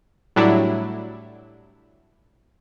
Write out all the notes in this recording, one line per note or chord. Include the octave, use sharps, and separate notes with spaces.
A2 F#3 G3 D4 E4